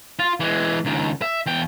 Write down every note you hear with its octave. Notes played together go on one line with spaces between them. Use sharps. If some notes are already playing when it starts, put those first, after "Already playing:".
F4
E3 G#3
C#2 D#3
E5
E2 G5